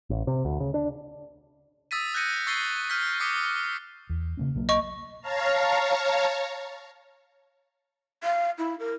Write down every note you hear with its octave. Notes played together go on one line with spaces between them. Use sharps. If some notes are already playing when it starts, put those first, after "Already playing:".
A1
C3
D2
C#3
D4
D#6 E6 A6 B6 D#7
E6 F#6 G6 A#6 C#7 D#7
C#6 E6 A6 B6 C7 G7
F6 G6 B6
D6 D#6 B6 C#7
E2
C#3 A#3 C#4
B1 F#3 A#3
D#5 C#6
C#5 F5 A5 A#5
F5
E4
A#4